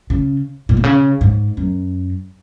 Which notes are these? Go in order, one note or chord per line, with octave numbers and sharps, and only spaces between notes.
C#3
A#2
C3
C#3
G#2
F#2